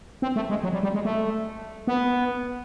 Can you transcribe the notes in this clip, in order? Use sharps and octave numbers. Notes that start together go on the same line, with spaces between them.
C4
A3
G#3
F#3
G3
G3
G#3
A3
B3